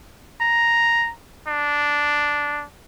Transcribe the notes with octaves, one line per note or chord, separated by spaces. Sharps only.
A#5
D4